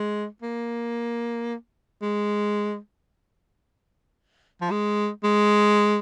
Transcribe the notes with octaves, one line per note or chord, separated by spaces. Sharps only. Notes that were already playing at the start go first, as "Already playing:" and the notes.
Already playing: G#3
A#3
G#3
F3
G#3
G#3